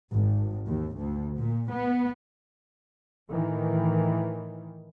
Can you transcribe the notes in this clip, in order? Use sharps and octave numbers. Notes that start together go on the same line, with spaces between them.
G#1
D#2
D2
A#2
B3
A2 D#3 E3